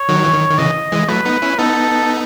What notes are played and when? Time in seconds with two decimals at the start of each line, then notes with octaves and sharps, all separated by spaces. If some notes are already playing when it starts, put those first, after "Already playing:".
Already playing: C#5
0.08 D#3 F#3
0.25 E3
0.34 D#3
0.50 D#3
0.58 C#3 E3 D#5
0.92 E3 G#3
1.08 F#3 A3 B4
1.25 B3 D#4
1.42 C#4 E4
1.58 B3 D#4 A4